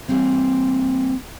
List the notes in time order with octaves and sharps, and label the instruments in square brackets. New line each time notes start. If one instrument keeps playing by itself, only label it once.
[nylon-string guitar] E3 F#3 G3 A#3 C4 C#5